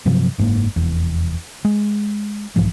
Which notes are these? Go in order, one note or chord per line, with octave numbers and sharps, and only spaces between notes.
G2 C3 F3 F#3
F#1 G#2 C#3 A#3
F1 E2
G#3
B1 G#2 E3 F3